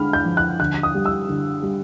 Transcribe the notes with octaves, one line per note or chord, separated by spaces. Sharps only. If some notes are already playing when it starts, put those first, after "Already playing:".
Already playing: D3 G#3 B5 F6
G6
F3
F#6
D3 F#6
D#6
G3
E6
D3
G3